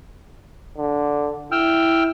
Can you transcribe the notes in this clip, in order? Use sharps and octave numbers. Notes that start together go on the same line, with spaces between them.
D3
E4 G5 E6 F6